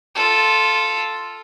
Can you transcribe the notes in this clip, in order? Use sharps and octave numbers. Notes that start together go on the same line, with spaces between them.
F4 A4